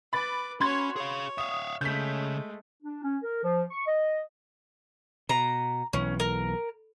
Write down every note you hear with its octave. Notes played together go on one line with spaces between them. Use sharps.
B4 B5 D6 A6
C#4 F#4 C#5 B5 C6 G#6
G#4 C#5 F5
E5 F5 D#6
C#3 G#3 A3 G6 B6
D4
C#4
A#4
F3
C#6
D#5
B2 A#5
B1 E3 C#4
A#4